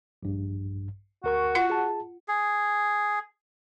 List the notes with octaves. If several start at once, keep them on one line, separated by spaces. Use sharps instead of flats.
A#1 G2
D2 F#4 A#4 C#6
F4 F#5
G#4 A5
G#4